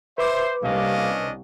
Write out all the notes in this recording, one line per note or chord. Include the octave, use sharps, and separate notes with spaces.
B4 C5 E5 D6
C2 A#3 C#4 D4 D#5